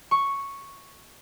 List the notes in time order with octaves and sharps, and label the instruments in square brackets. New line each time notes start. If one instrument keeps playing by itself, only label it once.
[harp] C#6